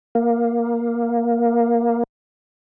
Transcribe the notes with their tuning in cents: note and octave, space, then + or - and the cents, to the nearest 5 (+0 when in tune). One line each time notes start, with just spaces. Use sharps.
A#3 +10